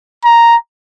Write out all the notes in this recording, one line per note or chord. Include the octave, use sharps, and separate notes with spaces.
A#5